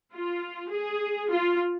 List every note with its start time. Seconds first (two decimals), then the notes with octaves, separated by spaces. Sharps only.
0.13 F4
0.71 G#4
1.30 F4